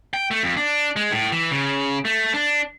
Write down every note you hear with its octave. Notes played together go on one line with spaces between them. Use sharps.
G5
A3
F2
D4
G#3
A2
E3
C#3
A3
D4